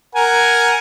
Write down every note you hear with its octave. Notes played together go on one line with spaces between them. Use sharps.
A#4 F#5 G#5